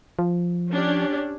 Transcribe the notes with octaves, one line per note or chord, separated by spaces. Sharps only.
F3
C#4 D4 G4